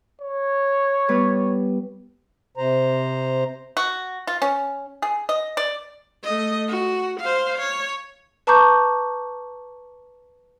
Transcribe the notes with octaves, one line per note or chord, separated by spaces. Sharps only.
C#5
G3 B3 B4
C3 C5 A#5
F#4
F4
C#4
G#4
D#5
D5
A3 D#5
F#4
C5 F5
C#5
B4 A5 A#5 C#6 D6 G6